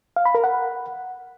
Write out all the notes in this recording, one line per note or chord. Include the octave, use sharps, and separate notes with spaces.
F5
B5
A#4
F#5